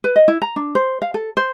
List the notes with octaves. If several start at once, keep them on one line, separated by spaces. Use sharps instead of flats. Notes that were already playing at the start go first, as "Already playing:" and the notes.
B4
D#5
E4
A#5
D4
C5
F5
A4
C5